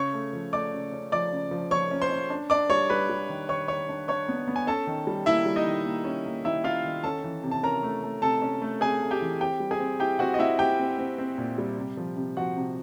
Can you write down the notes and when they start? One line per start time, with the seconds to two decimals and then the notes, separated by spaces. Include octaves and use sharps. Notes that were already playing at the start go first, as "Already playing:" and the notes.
Already playing: C#3 C#5 C#6
0.13 A3
0.33 F3
0.52 A3 D5 D6
0.73 C#3
0.92 C#4
1.12 F3 D5 D6
1.32 C#3
1.51 F3
1.71 F3 C#5 C#6
1.91 C#4
2.02 C5 C6
2.11 C#4
2.30 D4
2.50 D4 D5 D6
2.70 G3 C#5 C#6
2.90 G3 B4 B5
3.09 G3
3.29 D#3
3.49 D#3 C#5 C#6
3.68 D#3 C#5 C#6
3.89 D4
4.08 D4 C#5 C#6
4.28 B3
4.48 B3
4.56 G#5
4.67 C#4 A4 A5
4.87 D#3
5.07 G3
5.26 A#3 E4 E5
5.46 G3
5.56 D#4 D#5
5.67 D#3
5.86 A#3
6.05 C#4
6.26 A#3
6.45 D#3 E4 E5
6.64 C#4 F4 F5
6.85 D#3
7.04 C#4 A4 A5
7.24 E3
7.43 C3
7.51 A5
7.63 C#4 A#4 A#5
7.83 A3
8.03 A3
8.22 C3 A4 A5
8.42 C#4
8.62 A3
8.81 C3 G#4 G#5
9.02 A3
9.11 G4 G5
9.21 E3
9.41 C4 G4 G5
9.60 G3
9.71 G#4 G#5
9.80 C4
10.00 E4 G4 G5
10.19 C4 F#4 F#5
10.34 D#5
10.39 C4 E4 E5
10.59 C4 G4 G5
10.79 C4
10.99 C4
11.18 C4
11.38 A#2
11.58 G3
11.78 C3
11.97 F3
12.16 C3
12.37 F3 F#4 F#5
12.56 C3